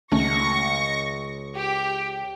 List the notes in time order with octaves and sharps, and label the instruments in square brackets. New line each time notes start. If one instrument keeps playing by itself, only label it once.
[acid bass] C#2 [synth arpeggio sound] D#3 A3 C#4 [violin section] C#6 A#6 C#7
[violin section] G4